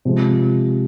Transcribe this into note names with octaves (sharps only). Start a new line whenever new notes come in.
C3 F3 G#3